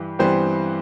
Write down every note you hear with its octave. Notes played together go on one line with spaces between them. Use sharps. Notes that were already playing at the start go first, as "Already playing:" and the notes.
Already playing: G2 E3 G4
G2 E3 G3 B3 C4 C5